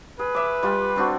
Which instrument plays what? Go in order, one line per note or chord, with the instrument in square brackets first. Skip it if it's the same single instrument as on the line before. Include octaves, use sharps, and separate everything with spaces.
[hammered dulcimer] G#4 [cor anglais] B4
[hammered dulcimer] E5 D6
G3 F4
C4 D4 F#4